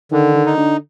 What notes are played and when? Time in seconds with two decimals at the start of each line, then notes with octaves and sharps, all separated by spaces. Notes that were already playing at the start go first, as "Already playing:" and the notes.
0.11 D3 D#3
0.35 D#3
0.46 D#4
0.57 D3